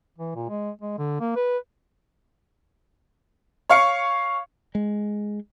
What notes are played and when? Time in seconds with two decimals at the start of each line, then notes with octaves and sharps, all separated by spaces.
0.19 E3
0.36 A#2
0.49 G#3
0.82 G#3
0.98 D3
1.21 A#3
1.36 B4
3.69 C#5 F5 C#6 C#7
4.75 G#3